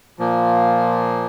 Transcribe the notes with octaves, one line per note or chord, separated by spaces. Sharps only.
A#2 F3 A#3